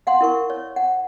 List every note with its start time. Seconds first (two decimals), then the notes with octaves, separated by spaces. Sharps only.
0.07 F5 F#5 C6
0.21 E4 A#4 C#6
0.50 C#5
0.76 F#5